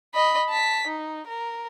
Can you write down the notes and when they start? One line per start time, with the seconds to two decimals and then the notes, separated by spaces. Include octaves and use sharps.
0.14 D#5 B5
0.50 A5 B6
0.87 D#4
1.27 A#4